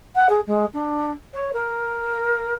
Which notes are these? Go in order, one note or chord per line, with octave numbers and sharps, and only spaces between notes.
F#5
G#4
G#3
D4
C#5
A#4